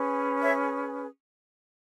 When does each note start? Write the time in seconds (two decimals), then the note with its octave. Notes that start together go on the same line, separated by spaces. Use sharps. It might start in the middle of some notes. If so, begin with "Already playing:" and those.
Already playing: C#4 G#4 B4
0.43 C#5 E5